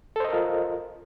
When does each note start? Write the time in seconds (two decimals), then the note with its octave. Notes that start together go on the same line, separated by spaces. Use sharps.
0.16 A4
0.20 C5
0.24 D#5
0.29 A#4
0.33 F4